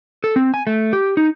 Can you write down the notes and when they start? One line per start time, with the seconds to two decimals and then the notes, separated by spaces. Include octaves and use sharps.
0.24 A4
0.36 C4
0.54 G#5
0.67 A3
0.93 G4
1.17 D#4